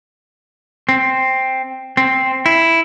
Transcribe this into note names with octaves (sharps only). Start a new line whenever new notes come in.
C4
C4
E4